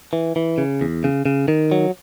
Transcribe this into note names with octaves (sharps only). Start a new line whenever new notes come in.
E3
E3
C#3
E2
C#3
C#3
D#3
F#3